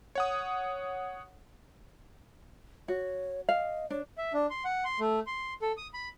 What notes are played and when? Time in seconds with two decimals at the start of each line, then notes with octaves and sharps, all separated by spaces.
0.15 C#5 F#5 D#6
2.88 F#4 C#5
3.49 D#5 F5
3.90 D4 C#5
4.18 E5
4.33 D4
4.50 C6
4.65 F#5
4.85 C6
5.00 A3
5.27 C6
5.62 A4
5.77 D#6
5.94 B5